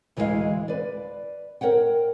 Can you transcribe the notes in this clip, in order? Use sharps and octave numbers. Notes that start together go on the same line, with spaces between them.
D2 E3 G#3 B4 D#5 F5
B4 D5
A#4 C#5 F#5 G5